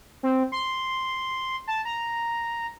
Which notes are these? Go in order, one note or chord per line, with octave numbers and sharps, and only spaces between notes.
C4
C6
A5
A#5